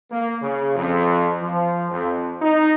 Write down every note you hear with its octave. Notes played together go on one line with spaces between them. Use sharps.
A#3
C#3
F2
F3
F2
D#4